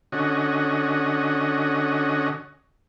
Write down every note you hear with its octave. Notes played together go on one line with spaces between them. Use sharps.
D3 C#4 F#4 D#5